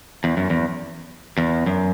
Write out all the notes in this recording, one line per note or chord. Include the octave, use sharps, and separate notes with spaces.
E2
F#2
E2
E2
F#2